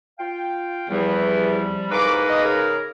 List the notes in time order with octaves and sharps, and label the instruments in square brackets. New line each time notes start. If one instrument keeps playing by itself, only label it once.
[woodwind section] F4 F5 G5
[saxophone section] E2 [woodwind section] C3 F3 G3
[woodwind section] C2 C#6 D6 [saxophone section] G#2 A#3 B4
[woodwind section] D#5
C#3 G#4 A#4